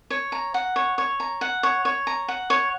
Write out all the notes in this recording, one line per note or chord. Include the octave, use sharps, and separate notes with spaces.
C#5
A#5
F#5
C#5
C#5
A#5
F#5
C#5
C#5
A#5
F#5
C#5